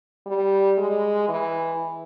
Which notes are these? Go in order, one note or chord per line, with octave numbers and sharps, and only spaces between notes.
G3
G#3
E3